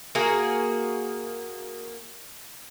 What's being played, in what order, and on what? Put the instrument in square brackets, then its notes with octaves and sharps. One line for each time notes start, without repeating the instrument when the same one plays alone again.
[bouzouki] A#3 F#4 G#4